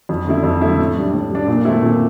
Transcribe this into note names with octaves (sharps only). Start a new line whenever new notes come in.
F2
D3 A3 E4
F2
D3 A3 E4
A2
G3 D4
A2
G3 D4
A#2
A3 C4 E4
A#2